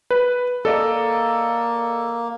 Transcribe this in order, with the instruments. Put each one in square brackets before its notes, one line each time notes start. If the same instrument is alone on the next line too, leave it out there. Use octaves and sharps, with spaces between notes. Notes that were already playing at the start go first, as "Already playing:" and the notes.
[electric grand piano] B4
[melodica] A#3 [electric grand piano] A4 D5 D#5